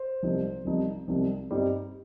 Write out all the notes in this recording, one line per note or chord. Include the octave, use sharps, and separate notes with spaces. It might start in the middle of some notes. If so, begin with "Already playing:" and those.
Already playing: C5
C2 C3 F3 D#4
C2 C3 F3 D#4
C2 C3 F3 D#4
G2 G3 C4 D#4